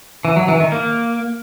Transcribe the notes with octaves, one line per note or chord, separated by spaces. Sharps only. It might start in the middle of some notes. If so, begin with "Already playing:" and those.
E3
F#3
E3
D#3
A#3